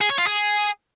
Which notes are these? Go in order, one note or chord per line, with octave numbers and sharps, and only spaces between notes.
G#4
C#5
F4
G#4